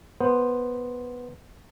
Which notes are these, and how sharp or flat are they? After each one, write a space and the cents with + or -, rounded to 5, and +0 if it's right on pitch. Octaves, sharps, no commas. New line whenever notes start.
B3 -5 C5 +0